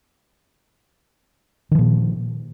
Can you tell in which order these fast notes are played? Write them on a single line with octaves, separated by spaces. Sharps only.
D#3 F3 A#2